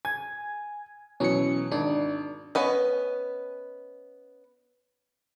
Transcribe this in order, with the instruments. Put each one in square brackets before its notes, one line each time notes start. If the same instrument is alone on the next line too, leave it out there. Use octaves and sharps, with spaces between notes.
[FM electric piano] G#5 [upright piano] G#6
[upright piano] B2 E3 F#3 [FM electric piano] C#4 C#7
[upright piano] G#1 [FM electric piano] D4
[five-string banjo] B3 C#4 B4 D#5